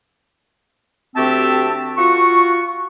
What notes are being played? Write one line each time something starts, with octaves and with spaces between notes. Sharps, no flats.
D2 C4 F#4 G4 E5 A5
F4 F#4 C#6